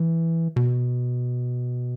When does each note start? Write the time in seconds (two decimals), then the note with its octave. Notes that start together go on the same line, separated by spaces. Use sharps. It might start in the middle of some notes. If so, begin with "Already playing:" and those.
Already playing: E3
0.56 B2